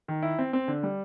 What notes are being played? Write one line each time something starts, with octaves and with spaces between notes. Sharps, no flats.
D#3
E4
C4
C4
D3
G3